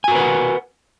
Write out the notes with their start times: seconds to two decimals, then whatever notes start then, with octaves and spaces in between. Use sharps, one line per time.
0.04 G#5
0.08 F#4
0.12 A#4
0.15 B4
0.19 F#5